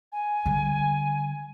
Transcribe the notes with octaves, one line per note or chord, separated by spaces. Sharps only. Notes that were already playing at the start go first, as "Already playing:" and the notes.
G#5
D3 G3